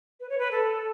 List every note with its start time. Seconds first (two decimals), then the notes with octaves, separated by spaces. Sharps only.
0.20 B4
0.29 C#5
0.39 B4
0.51 A4